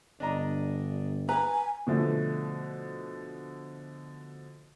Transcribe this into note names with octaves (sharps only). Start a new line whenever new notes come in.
G1 D4 D#5 A#5
B4 G#5 A#5
B2 D3 F3 A3